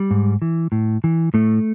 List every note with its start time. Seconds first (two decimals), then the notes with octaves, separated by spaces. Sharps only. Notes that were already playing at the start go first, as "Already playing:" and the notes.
Already playing: G3
0.11 G#2
0.42 E3
0.72 A2
1.04 E3
1.34 A2 A3